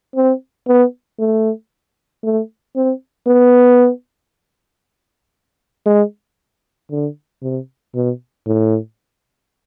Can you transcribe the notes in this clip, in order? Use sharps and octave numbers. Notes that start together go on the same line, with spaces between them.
C4
B3
A3
A3
C4
B3
G#3
D3
C3
B2
A2